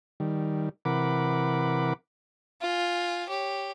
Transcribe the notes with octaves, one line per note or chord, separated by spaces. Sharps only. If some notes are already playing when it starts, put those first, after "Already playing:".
D#3 G3
C3 E3 A#4 F#5 B5 D6
F4 G#5
G4 C#5